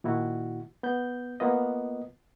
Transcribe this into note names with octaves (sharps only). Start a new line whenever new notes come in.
A#2 D#3 E4 F#4
B3 G6
A#3 B3 F4 D#5